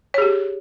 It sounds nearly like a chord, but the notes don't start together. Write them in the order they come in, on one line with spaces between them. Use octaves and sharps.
C#5 G#4 G4